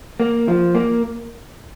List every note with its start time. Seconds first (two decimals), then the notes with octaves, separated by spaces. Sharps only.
0.20 A#3
0.48 F3
0.75 A#3